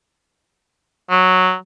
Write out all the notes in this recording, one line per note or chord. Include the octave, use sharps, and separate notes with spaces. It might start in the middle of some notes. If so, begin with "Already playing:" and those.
F#3